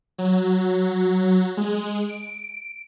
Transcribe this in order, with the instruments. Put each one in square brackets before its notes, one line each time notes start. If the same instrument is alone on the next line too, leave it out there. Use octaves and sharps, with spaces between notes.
[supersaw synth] F#3
G#3
D7